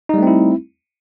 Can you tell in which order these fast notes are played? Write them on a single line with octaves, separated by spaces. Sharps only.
D#4 G3 A3 C4 E4